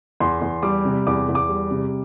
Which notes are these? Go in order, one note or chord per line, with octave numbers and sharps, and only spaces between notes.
E2 C6
E2
G3 D6
C3
E2 D6
E2
D6
G3
C3